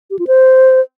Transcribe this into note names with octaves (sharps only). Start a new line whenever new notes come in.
G4
F4
C5